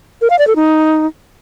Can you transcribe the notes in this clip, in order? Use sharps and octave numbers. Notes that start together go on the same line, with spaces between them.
A#4
F5
D5
A4
D#4